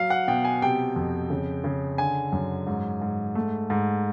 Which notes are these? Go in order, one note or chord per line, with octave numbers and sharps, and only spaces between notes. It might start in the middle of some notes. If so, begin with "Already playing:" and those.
Already playing: F#3 F5
F#5
B2 G5
G#5
C3 G5
F2
C#3
C#3
D3 G#5
F#2
G#2
G#2
A3
G#2